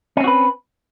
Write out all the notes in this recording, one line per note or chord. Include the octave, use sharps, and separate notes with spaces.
C4 C#4 F#4 B4